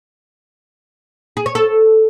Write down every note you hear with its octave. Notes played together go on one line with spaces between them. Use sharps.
G#4
C#5
A4